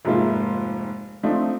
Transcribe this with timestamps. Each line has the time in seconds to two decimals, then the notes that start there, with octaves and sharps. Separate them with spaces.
0.05 F1 G#2 G#3 A#3 F4 E5
1.23 F3 A3 C4 D4 D#4